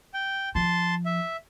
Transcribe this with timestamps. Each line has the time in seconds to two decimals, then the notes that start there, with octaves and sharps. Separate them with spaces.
0.14 G5
0.55 F3 A5 C6
1.06 E5